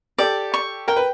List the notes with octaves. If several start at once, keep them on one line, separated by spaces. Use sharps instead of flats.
G4 A4 D5
C#6
A#4 G5
B4